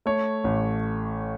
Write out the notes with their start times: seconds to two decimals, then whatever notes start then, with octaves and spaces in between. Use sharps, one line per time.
0.06 A3 C#5
0.44 A1